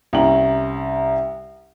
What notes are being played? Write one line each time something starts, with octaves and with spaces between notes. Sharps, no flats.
C2 C#4 G5 A#5 F#7